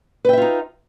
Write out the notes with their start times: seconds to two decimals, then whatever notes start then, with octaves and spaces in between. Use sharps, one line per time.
0.25 B4
0.29 G5
0.33 E5
0.37 F4
0.42 D#4